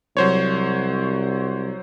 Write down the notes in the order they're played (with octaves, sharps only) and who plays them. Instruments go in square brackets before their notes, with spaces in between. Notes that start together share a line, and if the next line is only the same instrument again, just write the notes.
[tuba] C2 [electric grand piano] F#3 C5 C#5